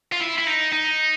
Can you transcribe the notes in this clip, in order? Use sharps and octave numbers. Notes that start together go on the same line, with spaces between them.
F4
E4
E4
D#4
D#4